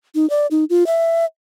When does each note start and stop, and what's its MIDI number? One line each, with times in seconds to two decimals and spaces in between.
0.15 0.28 63
0.30 0.47 74
0.51 0.64 63
0.70 0.86 65
0.86 1.25 76